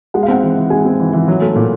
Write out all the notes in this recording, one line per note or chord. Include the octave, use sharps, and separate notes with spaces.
G#3 F#5
F5
C4 F#5
E3
E3
G#3 G#5
C4
E3
E3
F#3
A3
A#2